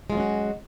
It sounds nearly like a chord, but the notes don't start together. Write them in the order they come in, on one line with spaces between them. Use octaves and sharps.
G#3 F4 F#3 C#4 F#4